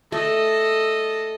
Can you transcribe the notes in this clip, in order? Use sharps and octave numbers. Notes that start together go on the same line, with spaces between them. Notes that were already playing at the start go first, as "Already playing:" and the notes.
A3 A4 D#5